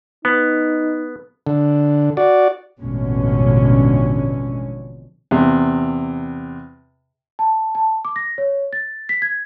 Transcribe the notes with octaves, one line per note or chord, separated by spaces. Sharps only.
B3 D#4
D3
F#4 D5
A1 F2 B2 D3 G#3 C#4
E2 C3
A5
A5
D6
A#6
C#5
A6
B6
G#6